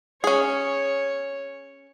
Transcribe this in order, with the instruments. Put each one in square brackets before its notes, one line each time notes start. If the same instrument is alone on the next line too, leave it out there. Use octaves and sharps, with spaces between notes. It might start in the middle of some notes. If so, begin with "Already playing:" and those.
[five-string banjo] C#4 G#4 [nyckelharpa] C#5